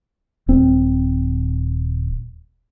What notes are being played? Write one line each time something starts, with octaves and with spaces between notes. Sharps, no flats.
D#1 C4